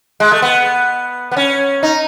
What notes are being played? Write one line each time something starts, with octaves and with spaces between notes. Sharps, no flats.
G#3
A3
B3
B3
C#4
D#4